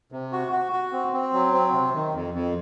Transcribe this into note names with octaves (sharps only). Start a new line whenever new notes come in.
C3
F#4
F#4
F#4
C4
C4
F#3
C4
C3
D#3
F2
F2